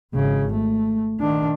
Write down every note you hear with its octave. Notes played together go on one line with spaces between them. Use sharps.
G#1 C#3
A3
D#3 D4